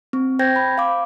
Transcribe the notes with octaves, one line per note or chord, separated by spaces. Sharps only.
C4
C5 G5 G6 G#6 A#6
B5
F5 D6